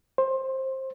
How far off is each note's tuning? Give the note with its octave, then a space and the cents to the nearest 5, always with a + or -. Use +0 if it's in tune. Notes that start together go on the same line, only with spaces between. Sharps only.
C5 +20